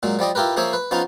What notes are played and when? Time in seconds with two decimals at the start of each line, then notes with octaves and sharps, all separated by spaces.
0.03 A#2 F#3 G#3
0.19 F3 G3 D5 D#5
0.35 E4 F4 G4 A#4 B4
0.56 F3 A#3 G#4 C5 C#5 E5
0.73 B4
0.91 F3 B3 C#4 D#4 F4